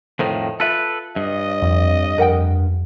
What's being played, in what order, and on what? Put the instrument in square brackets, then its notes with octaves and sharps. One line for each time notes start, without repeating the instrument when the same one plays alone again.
[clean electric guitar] F2 A2 D#3 [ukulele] C5
[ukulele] F4 E5 [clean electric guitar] A4 B4
[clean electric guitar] G2 [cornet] D#5
[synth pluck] F2
[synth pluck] F2 [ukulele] A#4 F#5 G5